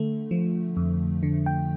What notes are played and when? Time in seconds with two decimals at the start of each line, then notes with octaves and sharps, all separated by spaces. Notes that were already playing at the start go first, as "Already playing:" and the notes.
Already playing: D3 A3
0.31 F3
0.77 F2
1.23 D3
1.46 G5